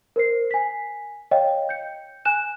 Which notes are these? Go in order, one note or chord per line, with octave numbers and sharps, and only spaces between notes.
A#4 C5 C7
G#5 B6
C#5 D#5 F5 G5
G6 C#7
G#5 F#6 E7